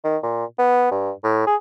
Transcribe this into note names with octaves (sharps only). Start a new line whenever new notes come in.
D#3
A#2
B3
G2
A2
G#4